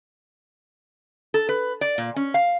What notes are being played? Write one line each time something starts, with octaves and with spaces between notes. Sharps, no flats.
A4
B4
D5
A#2
C#4
F5